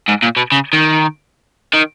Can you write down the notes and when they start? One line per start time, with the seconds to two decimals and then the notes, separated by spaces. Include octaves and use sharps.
0.08 G#2
0.22 A#2
0.37 B2
0.52 C#3
0.73 D#3
1.74 D#3